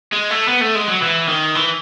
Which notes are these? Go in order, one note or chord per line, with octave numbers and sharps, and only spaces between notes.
G#3
A3
B3
A3
G#3
F#3
E3
D#3
E3